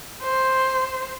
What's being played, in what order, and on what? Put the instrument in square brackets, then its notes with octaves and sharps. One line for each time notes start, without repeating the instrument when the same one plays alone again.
[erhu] C5